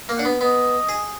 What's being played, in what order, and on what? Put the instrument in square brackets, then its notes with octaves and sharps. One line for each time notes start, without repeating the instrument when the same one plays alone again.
[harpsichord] A#3
[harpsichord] D4 [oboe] F#5
[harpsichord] B3
[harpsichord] B3 [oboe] D#5
[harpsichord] G#4